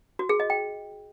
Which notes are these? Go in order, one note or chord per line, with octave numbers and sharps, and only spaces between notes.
F#4
G#4
D#5
G5